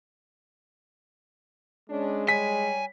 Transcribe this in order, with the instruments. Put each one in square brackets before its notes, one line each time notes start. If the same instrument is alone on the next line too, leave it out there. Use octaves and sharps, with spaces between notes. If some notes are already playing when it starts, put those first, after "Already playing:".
[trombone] G#3 [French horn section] C#4 D4
[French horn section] G3 C#5 [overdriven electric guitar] G#5 [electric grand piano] B6